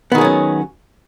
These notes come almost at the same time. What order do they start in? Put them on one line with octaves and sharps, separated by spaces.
B3 D#3 G#4 F#3 C#4